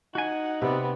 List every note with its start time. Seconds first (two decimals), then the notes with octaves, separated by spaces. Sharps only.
0.15 D#4 F#4 F#5 G#5
0.62 C3 B3 C4 D5